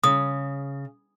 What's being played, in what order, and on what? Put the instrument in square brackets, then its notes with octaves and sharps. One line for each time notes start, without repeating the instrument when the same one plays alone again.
[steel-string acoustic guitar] C#3 [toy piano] D#6